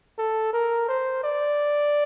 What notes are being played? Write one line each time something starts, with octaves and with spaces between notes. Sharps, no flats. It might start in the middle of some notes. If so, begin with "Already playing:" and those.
A4
A#4
C5
D5